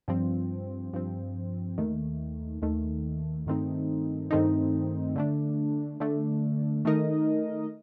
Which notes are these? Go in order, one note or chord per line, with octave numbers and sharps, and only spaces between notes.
G2 F3 C4
G2 F3 C4
D#2 D#3 A3
D#2 D#3 A3
G2 D#3 A3 C4 D#4
G2 D#3 A3 C4 D#4
D3 A3 D4
D3 A3 D4
D#3 A3 D#4 A#4 D#5